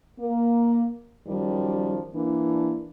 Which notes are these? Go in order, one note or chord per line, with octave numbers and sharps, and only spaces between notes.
A#3
F#2 D#3 F3 G3
E3 A#3 D4